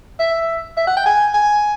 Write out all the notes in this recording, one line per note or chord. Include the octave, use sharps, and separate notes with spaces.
E5
E5
F#5
G5
G#5
G#5